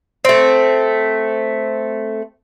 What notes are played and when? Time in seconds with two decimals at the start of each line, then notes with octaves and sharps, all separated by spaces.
0.25 A3 C4